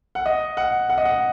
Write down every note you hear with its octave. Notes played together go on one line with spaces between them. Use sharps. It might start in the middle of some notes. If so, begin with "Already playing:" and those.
F#5
D#5
F#5
F#5
D#5
F#5